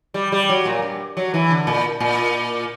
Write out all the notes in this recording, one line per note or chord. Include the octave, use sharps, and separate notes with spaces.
G3
G3
F#3
A#2
G2
F#3
E3
D3
A#2
A#2